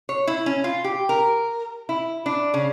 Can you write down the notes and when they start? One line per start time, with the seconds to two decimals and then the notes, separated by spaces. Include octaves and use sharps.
0.09 C#5
0.27 E4
0.46 C#4
0.64 F4
0.84 G4
1.09 A#4
1.89 E4
2.26 D4
2.54 C#3